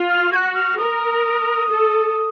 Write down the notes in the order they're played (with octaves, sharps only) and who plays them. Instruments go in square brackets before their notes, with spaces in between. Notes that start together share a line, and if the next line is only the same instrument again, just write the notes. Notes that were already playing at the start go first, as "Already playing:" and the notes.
Already playing: [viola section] F4
[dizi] F6
[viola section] F#4 [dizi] G#6
[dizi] F#6
F6
[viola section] A#4 [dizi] D#6
[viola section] A4